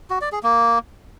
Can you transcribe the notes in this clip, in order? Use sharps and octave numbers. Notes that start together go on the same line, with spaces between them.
F#4
D5
G#4
A#3